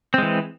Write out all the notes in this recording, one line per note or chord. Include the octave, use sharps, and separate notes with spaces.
E3 G#3 C4